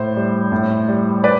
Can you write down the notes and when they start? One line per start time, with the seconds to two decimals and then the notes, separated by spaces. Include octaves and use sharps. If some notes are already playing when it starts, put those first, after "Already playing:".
Already playing: A2 C5
0.16 G3
0.52 A2
0.88 G3
1.24 B4 D5